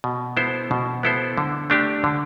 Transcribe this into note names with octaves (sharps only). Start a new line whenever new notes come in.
B2
B3 E4 A4 C5
B2
B3 E4 A4 C5
D3
A3 D4 G4
D3